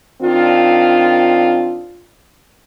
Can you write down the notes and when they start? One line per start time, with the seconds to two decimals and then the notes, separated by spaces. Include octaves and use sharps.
0.21 D#3 C4 D4 F4